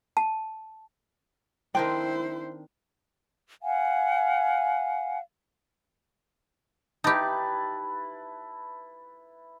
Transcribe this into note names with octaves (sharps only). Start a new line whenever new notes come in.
A5
D#3 C4 D4 E4 C5 G5
F5 F#5 G#5
D#4 E4 G4 B4 A5